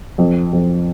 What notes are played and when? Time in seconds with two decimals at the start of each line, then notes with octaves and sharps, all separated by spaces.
0.18 F2
0.53 F2